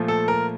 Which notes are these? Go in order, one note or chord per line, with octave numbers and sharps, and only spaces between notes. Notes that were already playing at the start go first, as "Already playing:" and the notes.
Already playing: A#2 F3 A3
A4
A#4